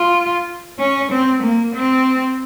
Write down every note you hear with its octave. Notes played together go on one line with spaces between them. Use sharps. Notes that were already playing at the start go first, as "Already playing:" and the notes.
Already playing: F4
C#4
C4
A#3
C4